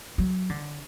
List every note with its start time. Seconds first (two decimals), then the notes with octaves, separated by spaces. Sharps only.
0.18 F#3
0.50 D3